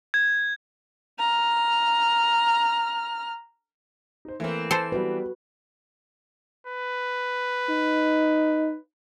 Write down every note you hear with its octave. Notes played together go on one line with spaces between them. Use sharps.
G#6
A#5 F6
D#4 C5
E3 A3 A#3 C4 A#4
A4 B4 C5
G3 B3 F#4 G4 B4
B4
D#4